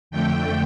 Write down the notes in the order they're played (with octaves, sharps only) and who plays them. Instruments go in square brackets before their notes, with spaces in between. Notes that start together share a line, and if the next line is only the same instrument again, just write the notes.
[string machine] F2 D3 A3 G5